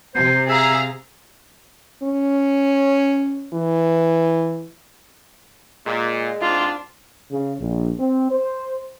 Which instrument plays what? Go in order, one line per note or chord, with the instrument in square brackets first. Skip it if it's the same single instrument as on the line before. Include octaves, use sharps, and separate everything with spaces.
[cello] C3 [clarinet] C5
[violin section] G#4 F5 A#5 [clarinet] E5
[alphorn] C#4
E3
[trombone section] A#2 [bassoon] G#3
[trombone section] G#2 C4 D4 [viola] F4
[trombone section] C#3
A#1
C4
C5